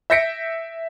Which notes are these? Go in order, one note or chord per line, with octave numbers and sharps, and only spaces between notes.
E5 G6 A#6 B6 C#7 D7